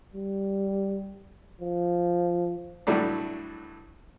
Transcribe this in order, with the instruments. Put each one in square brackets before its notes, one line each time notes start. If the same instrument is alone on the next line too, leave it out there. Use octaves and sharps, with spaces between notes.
[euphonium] G3
F3
[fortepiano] A2 E3 F#3 G3 A3 D4